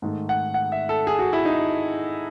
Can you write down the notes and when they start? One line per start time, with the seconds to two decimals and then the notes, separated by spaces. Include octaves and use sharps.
0.02 G#2 D#3 A3
0.29 F#5
0.54 F#5
0.72 E5
0.89 A4
1.07 G#4
1.19 F#4
1.33 E4
1.45 D#4